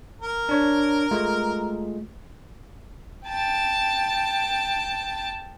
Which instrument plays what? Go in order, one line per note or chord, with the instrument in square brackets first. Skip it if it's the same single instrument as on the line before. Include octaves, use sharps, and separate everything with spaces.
[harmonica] A#4
[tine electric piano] D4 C#5
G#3 A3 F4
[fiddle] G5 A5